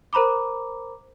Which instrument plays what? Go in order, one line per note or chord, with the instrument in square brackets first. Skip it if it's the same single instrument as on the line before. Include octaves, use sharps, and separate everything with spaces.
[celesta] A#4 C5 A#5 B5 D6